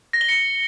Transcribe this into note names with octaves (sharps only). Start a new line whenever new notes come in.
A#6
G7
C#7